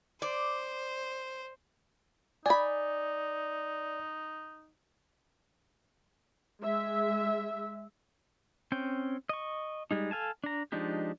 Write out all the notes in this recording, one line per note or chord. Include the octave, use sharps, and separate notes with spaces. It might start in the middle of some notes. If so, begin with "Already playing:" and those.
C5 D5
D#4 D5 G#5 B5
G#3 E5
C4 C#4 G5
D#5 C#6
G3 G#3 D#4
A4 F5 G#5 A5
D4 A#5
F3 G#3 D4 D#4 G4